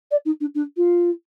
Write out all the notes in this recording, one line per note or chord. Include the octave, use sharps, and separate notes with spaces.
D5
D#4
D4
D4
F4